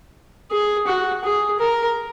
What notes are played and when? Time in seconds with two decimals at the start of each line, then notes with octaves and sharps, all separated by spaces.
0.51 G#4
0.87 F#4
1.24 G#4
1.60 A#4